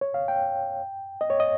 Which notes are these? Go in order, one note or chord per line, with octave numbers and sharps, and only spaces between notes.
C#5
F5
G5
D#5
C#5
D#5